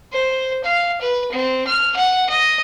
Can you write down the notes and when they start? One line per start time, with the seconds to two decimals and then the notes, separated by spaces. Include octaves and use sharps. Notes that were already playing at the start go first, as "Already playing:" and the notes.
0.12 C5
0.64 F5
1.01 B4
1.32 C4
1.67 F6
1.96 F#5
2.29 D#5